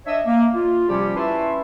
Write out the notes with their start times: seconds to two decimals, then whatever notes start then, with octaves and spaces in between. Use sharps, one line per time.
0.06 D4 C#5 D#5 E5
0.26 A#3
0.54 F4
0.88 C3 F3 G3 C#4 G4
1.16 C#4 E4 B4 E5 A5 C6